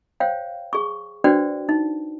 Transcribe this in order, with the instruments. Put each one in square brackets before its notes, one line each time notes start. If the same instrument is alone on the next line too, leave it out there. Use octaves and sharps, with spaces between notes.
[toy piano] C5 C#5 F5 G5
G#4 C#6
D4 F#4 B4 C5 D5 G5
D#4